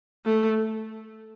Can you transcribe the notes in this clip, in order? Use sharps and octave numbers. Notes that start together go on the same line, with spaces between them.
A3